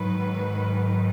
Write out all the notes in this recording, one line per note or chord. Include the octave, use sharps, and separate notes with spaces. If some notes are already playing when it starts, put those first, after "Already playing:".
Already playing: G#2 D#3 F#3 B4